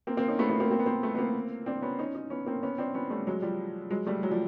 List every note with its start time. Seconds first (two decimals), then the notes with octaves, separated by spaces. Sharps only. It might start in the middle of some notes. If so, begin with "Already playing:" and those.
0.07 A#3 C4
0.17 A#3 C4
0.28 C#4 D#4
0.39 A3 B3
0.50 A3 B3
0.60 A#3 C4
0.71 A#3 C4
0.79 B3
0.86 A#3 C4
1.03 A3 B3
1.15 B3
1.19 A#3 C4
1.66 C4 D4
1.82 B3 C#4
1.99 C#4 D#4
2.15 C#4 D#4
2.30 B3 C#4
2.46 A#3 C4
2.63 B3 C#4
2.78 C4 D4
2.94 B3 C#4
3.10 G3 A3
3.27 F#3 G#3
3.42 F3 G3
3.91 F#3 G#3
4.07 G3 A3
4.23 F#3 G#3
4.31 F3 G3